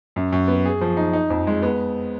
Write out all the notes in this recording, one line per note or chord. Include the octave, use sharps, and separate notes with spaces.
F#2
F#2
B3
G#4
F3
D#4
D#4
F2
G#3
B3